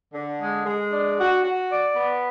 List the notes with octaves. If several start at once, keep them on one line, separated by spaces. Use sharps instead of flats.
D3
G#3
G#3
D4
F#4
F#4
D5
B3